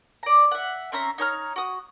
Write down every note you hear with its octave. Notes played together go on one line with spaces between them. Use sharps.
D5 A#5
E5 F#5
C4 C#4 E5 A#5
D#4 C#5 A#5 F6
F#4 D#6